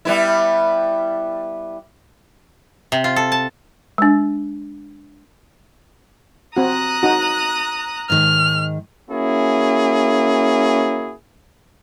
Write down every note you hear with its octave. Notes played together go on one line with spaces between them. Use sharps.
G3 B3 E4
C3
F4
A4
A5
G#3 D4
C4 F#4 A#5 D#6 F#6
D#4 F#4
G#2 D#3 F6
A#3 C#4 E4 F#4 G#4